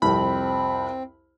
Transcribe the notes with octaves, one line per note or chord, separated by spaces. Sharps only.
C2 F2 C4 B5